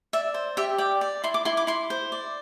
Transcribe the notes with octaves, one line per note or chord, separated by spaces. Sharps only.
D5 E5
C5
G4 E5
D5 G5
D5
E4 C6
D6
E4 C6
D6
E4 C6
C5
D5